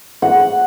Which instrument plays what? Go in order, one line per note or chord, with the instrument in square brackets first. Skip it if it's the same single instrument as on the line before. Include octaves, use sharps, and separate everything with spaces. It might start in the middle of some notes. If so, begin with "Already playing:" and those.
[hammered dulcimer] F#5